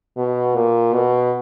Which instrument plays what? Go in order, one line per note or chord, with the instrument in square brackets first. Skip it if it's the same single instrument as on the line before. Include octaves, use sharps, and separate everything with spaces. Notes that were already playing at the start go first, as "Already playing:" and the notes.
[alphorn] B2
A#2
B2